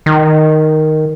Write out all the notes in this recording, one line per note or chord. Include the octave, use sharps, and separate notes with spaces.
D#3